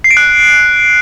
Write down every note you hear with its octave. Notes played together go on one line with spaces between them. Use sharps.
C7
D7
F#6